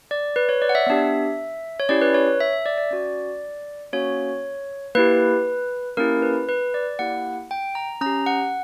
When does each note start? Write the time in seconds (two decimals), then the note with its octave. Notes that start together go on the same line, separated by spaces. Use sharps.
0.11 D5
0.36 B4
0.49 C#5
0.62 D5
0.69 F#5
0.75 E5
0.87 B3 D4 G4
1.80 C#5
1.89 C#4 E4 G4 D5
2.01 B4
2.14 C#5
2.40 E5
2.53 E5
2.66 D5
2.78 D5
2.91 C#4 F#4
3.93 A#3 C#4 F#4 C#5
4.95 A#3 E4 G4 B4
5.97 A#3 C#4 E4 G4 A#4
6.22 B4
6.49 B4
6.74 D5
6.99 A#3 E4 G4 F#5
7.51 G5
7.75 A#5
8.01 C#4 G4 A#5
8.27 F#5